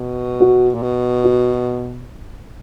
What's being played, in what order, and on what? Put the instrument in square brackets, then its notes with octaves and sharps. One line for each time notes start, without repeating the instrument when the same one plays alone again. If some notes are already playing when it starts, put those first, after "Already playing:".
Already playing: [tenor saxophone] B2
[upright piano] F#4
[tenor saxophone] A#2
B2
[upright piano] F#4